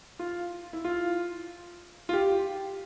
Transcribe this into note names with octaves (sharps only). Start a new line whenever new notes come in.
F4
E4
F4
F4
G4